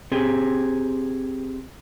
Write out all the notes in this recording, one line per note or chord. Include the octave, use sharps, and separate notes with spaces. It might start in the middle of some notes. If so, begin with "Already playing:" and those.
C4 G4 G#4